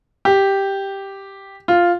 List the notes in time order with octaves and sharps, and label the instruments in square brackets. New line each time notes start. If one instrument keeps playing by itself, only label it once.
[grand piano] G4
F4